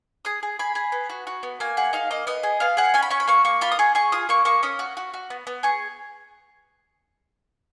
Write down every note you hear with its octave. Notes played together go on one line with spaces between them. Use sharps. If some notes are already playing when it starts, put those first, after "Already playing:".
G#4 D#6
G#4
G#4 B5
G#4
B3
F#4
F#4
B3
A#3 G#5
G#4 F#5
D#4 F5
A#3 D#5
B3 D#5
G#4
B3 F5
G#4 F#5
C#4 G#5
B5
C#4 C#6
B5
A#3 C#6
A#3 C#6
F4 B5
D#6
G#4 C#6
G#4 C#6
F4 D#6
A#3 C#6
A#3 C#6
C#4 D#6
F#4
F#4
F#4
B3
B3
G#4 C#6